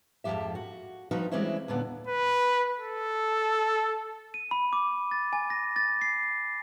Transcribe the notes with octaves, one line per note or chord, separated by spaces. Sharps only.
F2 G#2 C3 F3 G4 E5
F#4
F3 G3 D#4 F#4 B4
E3 G3 G#3 C4 C#4 E4
D#2 A#2 D3 B3
B4
A4
D#7
B5
D6
A6
G#5
A#6
A6
C7